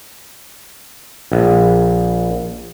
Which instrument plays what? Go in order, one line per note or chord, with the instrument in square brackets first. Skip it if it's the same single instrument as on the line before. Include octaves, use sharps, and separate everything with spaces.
[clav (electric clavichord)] A#1